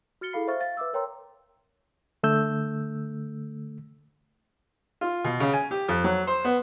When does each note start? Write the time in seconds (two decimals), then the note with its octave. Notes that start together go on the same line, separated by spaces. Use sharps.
0.21 F#4 F6 A6 C#7 G7
0.33 E4 G#4 A4 F5 B5 C7
0.47 C5 E5 F5 C#6 F6 A6
0.60 F5 A6
0.77 B4 E5 D6 E6
0.93 A#4 C#5 G5 A#5 C6 E6
2.23 D3 A3 E6 G6
5.01 F4
5.24 B2
5.40 C#3
5.53 G#5
5.71 G4
5.88 F2
6.04 F#3
6.27 C5
6.45 B3